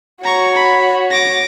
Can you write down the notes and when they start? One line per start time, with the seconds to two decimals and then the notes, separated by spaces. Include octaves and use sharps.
0.24 F#4 C#5 A#5 C#6
0.55 B5
1.10 D6 A#6